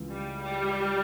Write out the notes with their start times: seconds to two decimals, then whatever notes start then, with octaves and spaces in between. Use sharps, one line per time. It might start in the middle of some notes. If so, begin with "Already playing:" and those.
Already playing: C#2 C#3 E3
0.12 G3
0.42 G3